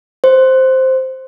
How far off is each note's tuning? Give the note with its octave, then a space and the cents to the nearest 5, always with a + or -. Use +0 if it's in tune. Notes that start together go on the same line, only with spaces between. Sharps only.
C5 +0